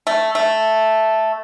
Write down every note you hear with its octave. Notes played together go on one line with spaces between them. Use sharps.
A3
A3